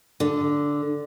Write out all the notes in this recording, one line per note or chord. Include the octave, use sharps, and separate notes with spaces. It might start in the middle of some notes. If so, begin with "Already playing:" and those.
D3